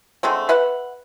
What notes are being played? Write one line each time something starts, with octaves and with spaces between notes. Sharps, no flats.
D3 G#3 A3 C4
B4 E5 F#5